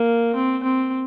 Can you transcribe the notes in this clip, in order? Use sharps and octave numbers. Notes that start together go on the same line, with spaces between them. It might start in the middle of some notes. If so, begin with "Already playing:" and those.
Already playing: A#3
C4
C4